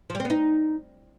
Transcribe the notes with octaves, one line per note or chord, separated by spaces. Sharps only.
F3
G3
C4
B3
D#4